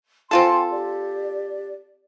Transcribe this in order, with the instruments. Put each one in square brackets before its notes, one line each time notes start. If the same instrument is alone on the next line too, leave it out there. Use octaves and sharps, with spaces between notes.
[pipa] C4 F4 A4 [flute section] G5 G#5 C6
[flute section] G4 D5